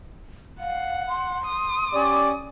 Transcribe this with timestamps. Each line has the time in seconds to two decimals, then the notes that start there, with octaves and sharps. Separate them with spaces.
0.60 F5 F#5
1.08 C6
1.44 D#6
1.93 C#4 G4 D5